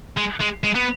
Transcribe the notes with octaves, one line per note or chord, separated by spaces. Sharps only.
G#3
G#3
G#3
B3